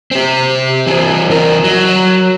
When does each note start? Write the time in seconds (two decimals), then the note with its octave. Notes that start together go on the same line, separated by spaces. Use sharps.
0.11 C4 G4
0.87 E3 C4
1.30 E3 A#4
1.64 F#3